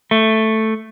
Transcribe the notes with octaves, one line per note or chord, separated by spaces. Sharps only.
A3